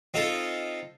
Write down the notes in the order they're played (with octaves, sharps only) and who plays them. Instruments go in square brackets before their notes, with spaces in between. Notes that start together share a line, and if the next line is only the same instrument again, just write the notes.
[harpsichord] C4 D#4 F4 A4